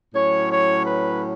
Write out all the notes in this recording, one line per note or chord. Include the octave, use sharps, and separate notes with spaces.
A2 F#3 C#4 C#5
C#5
B4